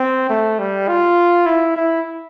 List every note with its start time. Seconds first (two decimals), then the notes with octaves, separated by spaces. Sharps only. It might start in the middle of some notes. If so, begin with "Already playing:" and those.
Already playing: C4
0.30 A3
0.59 G3
0.88 F4
1.46 E4
1.76 E4